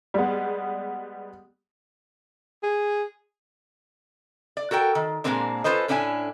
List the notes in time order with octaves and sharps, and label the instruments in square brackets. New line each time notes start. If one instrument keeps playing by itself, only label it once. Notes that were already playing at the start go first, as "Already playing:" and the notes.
[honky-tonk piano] G3 G#3 B3
[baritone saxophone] G#4
[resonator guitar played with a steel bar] D5
F#4 A4 A#4 G5
D#3
A#2 C#3 G#3 A#3 C4 D4
C#4 F4 A4 B4 C5 D#5
A2 C#4 D4 E4 G5 G#5